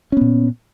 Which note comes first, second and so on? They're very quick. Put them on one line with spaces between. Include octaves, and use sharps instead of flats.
C#4 B3 A#2